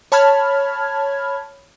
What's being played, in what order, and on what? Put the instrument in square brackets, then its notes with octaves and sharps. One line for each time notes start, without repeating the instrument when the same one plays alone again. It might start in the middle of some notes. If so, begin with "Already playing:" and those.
[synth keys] C#5 A5 B5 F6 G#6